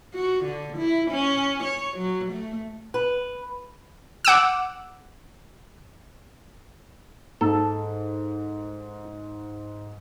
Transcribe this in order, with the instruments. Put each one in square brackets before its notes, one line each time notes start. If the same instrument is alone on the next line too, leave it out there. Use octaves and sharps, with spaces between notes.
[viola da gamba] F#4
D3
E4
C#4
C#5
F#3
A3
[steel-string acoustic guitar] B4
[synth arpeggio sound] F#5 D6 E6
[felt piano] G#2 [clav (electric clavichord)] A4